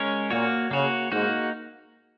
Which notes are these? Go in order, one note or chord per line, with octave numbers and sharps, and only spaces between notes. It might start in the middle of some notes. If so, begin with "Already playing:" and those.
Already playing: G#3 C#4 A#4 C#5
A#2 A#3 F#4 C#5
C#3 A#3 F#4 C#5
G#2 A#3 D#4 F#4